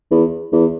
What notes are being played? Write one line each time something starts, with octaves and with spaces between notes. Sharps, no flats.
E2
E2